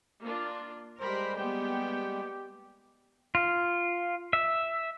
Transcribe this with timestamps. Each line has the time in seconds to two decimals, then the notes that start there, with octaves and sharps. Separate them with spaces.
0.22 A#3 D4 F4
1.01 G3 G#3 G4 A#4 C5 B5
1.37 A#3 B3 G4 G5
3.35 F4
4.33 E5